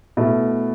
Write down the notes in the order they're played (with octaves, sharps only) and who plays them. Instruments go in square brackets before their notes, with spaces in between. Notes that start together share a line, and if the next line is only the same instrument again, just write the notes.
[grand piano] B2 A3 E4